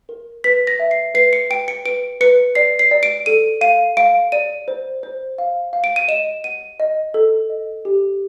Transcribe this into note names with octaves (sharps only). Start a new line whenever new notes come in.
A#4
B4 B6
A#6
E5
C7
B4 C7
C#7
G5 D7
C#7
B4 D7
B4 C#7
D5 C7
C7
D5
D7
A4 D#7
F5 D#7
F5 D7
D5 D#7
C5
C5
F5
F5
D7
D#7
D#5 E7
F#5 D#7
D#5
A4
D#5
G4